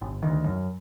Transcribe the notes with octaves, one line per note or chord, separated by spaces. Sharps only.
G1
D2 D#3
F#2